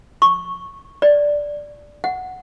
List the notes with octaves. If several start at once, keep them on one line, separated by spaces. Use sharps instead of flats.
C#6
D5
F#5